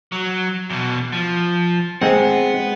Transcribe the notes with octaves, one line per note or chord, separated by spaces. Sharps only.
F#3
E2 B2
F3
G#3 B3 C4 F#5